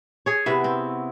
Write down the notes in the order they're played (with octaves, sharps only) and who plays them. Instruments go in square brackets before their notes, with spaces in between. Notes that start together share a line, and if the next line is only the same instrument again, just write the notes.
[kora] G#4 C#5
[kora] C3 B4 E5 [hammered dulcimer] B3 E4 F#4
[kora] C4